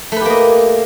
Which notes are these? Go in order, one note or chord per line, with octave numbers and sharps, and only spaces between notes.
A3 A#3 G4 B4 D#5